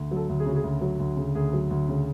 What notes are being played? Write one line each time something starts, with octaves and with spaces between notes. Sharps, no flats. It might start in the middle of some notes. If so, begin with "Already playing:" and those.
Already playing: D2
F#3 A4
D2
G#4
C#3 F#4
G#4
D2
F#3
D2
C#3
D2 G#4
F#3
D2
C#3